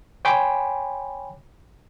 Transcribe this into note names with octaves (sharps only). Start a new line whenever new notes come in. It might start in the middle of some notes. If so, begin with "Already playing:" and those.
C#5 G5 G#5 B5 C6 D6